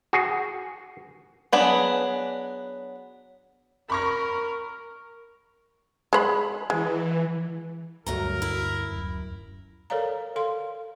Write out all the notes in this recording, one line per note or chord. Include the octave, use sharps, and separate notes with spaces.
F#4 G#4
F#3 B3 D4 G#4
A#4 B5 C#6 A#6
G#3 C#5 B5
E3 G#3
D2 G2 F#3 A3 A#4 A#5
E4
D1 F#2
A4 A#4 C#5 D5 F5 A#5
A4 F5 C6